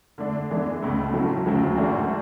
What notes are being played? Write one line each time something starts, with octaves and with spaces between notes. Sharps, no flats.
D3 A3 D4
E3 G#3 B3 D4
C#2 B2 A3
G#2 F#3 C#4 E4 A4
D2 C#3 F#3 A3
G#2 E3 A3 D4 F#4